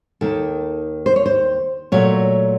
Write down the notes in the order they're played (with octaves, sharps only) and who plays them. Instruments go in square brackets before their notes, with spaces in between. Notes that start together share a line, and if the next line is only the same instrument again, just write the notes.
[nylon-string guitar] D#2 D#3 A#3 A4
C5
C#5
C5
A#2 F#3 A3 C#5